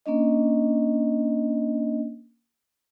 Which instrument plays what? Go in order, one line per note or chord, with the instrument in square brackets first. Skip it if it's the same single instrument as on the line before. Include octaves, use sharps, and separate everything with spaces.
[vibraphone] A#3 C#4 D4 D#5